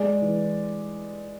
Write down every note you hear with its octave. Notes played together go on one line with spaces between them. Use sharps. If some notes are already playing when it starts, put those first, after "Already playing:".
Already playing: G#3 D5
E3